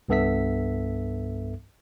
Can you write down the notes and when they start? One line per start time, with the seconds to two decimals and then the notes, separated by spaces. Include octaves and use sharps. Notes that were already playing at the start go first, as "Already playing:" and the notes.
0.08 C2 G2 B3 A4 E5 B6